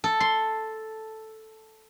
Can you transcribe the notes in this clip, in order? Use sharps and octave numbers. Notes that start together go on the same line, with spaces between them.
A4
C6